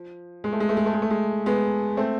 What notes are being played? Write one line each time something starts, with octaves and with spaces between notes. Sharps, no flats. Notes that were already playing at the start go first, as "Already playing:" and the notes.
Already playing: F3
G#3
A3
G#3
A3
G#3
A3
G#3
A3
G#3
G#3 B3
A3 C4